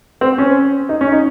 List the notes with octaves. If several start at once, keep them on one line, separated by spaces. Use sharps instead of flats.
C4
C#4
D#4
C#4
D#4